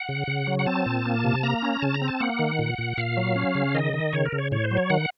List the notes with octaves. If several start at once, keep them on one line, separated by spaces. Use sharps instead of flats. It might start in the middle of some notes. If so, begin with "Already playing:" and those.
Already playing: F#5
C#3
C#3
F#3
F#5
C4 A5
A#2
A#3
C3
A#3 A#5
C#4
C#3 A5
A#5
C4
A5
A#3 F#5
D#3
A#2
A#2
A#2 F5
F#3
C#4
C#3
D#3 D#5
D#3
C#3 C#5
A#4
C#3
C#5
A2 C#5
C5
F#3
C#5
D#3 F#5